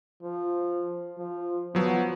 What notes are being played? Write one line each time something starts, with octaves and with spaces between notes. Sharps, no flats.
F3
F3
F3 F#3 B3